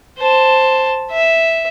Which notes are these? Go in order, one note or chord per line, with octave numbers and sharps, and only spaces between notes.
C5 A5
E5